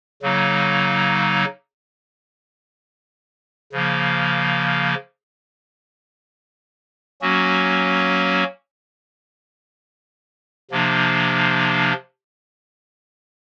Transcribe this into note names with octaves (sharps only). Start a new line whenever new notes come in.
C#3 F#3 A#3 D#4
C#3 F3 A#3
F#3 A#3 C#4 F#4
C3 F3 A#3 D4